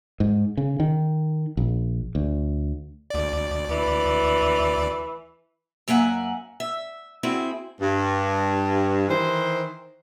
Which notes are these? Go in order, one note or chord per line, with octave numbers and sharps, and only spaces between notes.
G#2
C#3
D#3
A#1
D2
D2 D5
E3
F#2 A#3 E5 F#5 G#5
E5
C4 E4 F#4 G#4
G2
D#3 E3 C5